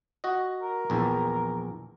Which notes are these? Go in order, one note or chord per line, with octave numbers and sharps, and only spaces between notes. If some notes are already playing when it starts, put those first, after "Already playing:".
F#4 D#5
A#4
A#1 E2